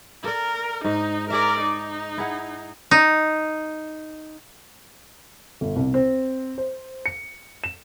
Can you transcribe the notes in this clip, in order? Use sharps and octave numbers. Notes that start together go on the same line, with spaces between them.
A4 A#4 D5
G#2 D#4
G#4 A#4 D5 E5
D#4
E4 G#4 F#5
D#4
G1
C2
C4
C5
C#7
E7